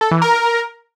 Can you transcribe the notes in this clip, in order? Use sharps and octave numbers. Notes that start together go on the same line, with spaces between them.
A4
E3
A#4